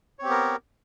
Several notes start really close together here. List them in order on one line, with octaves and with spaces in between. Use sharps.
C#5 C4 G4 B3 A#4